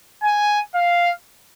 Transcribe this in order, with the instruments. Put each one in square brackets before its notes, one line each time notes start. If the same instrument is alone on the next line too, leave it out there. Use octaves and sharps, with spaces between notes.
[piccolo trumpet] G#5
F5